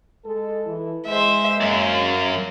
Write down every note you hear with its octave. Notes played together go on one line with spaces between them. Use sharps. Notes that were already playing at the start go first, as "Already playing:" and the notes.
G#3 A4
E3 E4
G#3 C5 E5
F#2 F#3 A#3